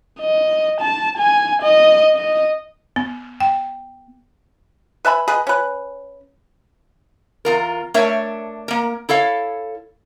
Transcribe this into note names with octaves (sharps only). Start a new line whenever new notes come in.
D#5
A5
G#5
D#5
D#5
B3
G5
B4 E5 G#5 B5
G#4 B4 D#5
C#4 B4
E2 F4 A#4
A3 D4 A#4 C#5 E5
A#3 A#4
E4 A4 C#5 F5